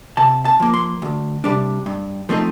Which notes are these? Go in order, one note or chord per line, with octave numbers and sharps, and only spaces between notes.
C3 A5
A5
F3 A#3
C6
D2
C3 G3 D4
G2
F3 A3 C4 D#4